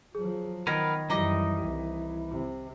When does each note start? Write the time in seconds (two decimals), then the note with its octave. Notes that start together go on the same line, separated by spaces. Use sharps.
0.15 F3 F#3 G#4
0.67 D#3 B3 A#4 B4 B5 G#6 A#6
1.10 F#2 E3 G3 D#4 D#5 A#5 D6 A#6
1.64 C2
2.29 C3